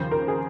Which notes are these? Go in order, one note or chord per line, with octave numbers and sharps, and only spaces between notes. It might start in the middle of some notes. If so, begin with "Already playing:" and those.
Already playing: D#2 C#3 F3 C5
A#4
G#4